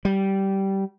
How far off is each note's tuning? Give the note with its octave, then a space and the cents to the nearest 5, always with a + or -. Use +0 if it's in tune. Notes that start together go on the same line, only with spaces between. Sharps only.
G3 -15